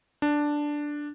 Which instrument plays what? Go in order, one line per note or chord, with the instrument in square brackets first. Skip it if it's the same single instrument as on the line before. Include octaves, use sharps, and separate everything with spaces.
[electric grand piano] D4